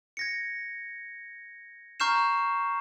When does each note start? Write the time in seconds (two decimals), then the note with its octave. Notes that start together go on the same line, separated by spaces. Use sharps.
0.17 G#6 A#6 C#7
2.00 A#5 C#6 F6 G6 C7 E7